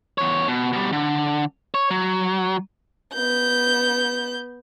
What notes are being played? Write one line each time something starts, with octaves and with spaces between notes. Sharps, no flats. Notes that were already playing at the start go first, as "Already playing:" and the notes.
E2 C#5
B2
B2 G3
D3
C#5
F#3
B3 G6